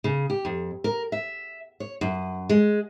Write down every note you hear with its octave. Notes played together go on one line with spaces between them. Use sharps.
C#3
G4
F2
A#4
E5
C#5
F#2
G#3